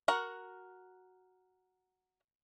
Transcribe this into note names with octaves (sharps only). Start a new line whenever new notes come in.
F#4 A#4 F#5